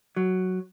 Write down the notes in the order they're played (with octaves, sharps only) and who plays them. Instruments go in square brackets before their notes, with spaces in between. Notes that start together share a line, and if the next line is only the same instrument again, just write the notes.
[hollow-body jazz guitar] F#3